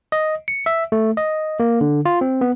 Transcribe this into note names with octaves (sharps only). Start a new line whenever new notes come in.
D#5
C#7
E5
A3
D#5
A#3
D3
F4
C4
B3